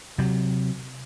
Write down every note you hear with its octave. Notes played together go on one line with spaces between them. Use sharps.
C3 F#3